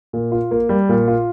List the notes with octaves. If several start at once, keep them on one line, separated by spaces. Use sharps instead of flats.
A#2
F4
A#3
G3
A#2
F4